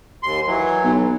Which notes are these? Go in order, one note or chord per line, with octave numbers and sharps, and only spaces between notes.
D#2 C6
E3 F#3
B1